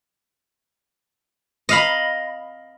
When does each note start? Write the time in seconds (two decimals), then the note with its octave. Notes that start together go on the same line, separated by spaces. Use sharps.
1.69 D#5 F5 B5